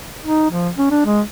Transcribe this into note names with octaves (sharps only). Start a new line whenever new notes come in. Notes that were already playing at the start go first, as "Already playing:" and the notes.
D#4
F3
C#4
D4
G#3